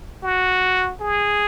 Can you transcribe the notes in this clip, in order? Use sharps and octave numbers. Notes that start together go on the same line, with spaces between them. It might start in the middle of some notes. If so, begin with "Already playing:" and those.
F#4
G#4